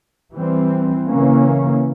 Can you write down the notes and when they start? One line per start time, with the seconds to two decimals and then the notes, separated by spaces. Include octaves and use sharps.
0.32 E3 G3 C4
1.07 C#3 E3 A#3 C#4